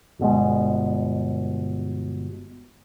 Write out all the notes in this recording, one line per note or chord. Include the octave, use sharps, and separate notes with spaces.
G1 B2 G#3